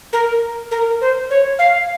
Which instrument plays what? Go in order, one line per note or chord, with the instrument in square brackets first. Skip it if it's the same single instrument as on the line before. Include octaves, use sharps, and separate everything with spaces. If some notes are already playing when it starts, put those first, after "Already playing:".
[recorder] A#4
A#4
C5
C#5
F5